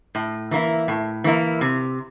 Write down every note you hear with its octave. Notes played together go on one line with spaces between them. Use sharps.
A2
E3 A#3 E4
A2
E3 A#3 E4
C3